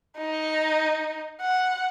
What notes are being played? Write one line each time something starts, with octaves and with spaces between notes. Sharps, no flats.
D#4
F#5